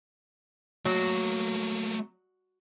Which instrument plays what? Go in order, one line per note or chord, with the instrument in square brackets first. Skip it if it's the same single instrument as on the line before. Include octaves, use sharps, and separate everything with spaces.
[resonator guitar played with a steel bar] F#3 [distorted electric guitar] A3 A#3